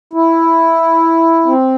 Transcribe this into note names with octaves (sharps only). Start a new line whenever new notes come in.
E4
C4